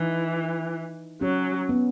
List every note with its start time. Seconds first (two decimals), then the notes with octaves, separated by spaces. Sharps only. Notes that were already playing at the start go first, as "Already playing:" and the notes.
Already playing: E3 D#4
1.21 F#3 C#4
1.69 B3